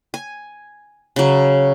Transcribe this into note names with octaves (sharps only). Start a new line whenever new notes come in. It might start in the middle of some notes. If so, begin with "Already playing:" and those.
G#5
C#3 F#3